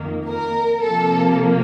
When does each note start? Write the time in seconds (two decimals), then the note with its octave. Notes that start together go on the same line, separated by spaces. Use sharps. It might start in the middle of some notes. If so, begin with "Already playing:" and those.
Already playing: F2 D#3 A#3
0.28 A#4
0.83 C3 F3 A#3 A4